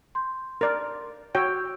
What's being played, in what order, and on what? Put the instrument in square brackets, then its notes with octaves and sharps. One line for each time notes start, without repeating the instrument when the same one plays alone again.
[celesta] C6 G6
[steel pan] A#4 D5
[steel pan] F#4 C#5 G5 [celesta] E6 G6